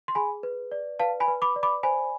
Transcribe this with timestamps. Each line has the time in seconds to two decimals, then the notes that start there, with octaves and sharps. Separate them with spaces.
0.08 C6
0.15 G#4 G#5 B5
0.43 B4
0.72 D5
0.99 B4 F5 A5
1.20 G#5 B5
1.28 B4
1.42 B5 D6
1.56 D5
1.63 B5 D6
1.83 C5 G#5 B5